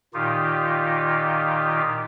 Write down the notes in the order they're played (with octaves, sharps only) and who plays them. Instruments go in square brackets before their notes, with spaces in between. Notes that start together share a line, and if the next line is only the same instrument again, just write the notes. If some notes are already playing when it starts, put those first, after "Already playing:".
[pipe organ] A#2 D#3 D#4 F4 G4